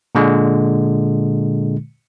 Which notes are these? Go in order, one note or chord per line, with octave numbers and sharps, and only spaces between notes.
A#2 D3 G#3